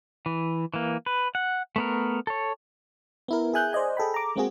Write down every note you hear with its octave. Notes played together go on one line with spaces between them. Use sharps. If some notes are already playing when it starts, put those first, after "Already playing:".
E3
E3 A#3
B4
F#5
A3 B3 A#4
A4 C#5
B3 E4 A#4
G#4 E5 G#5 F#6 G6
C5 D5 D#5 G#5
G#4 A4 G5 B5
A#5 D6
G#3 A#3 C4 F#4 G#4